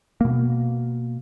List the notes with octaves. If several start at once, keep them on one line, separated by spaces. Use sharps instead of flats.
B2 A#3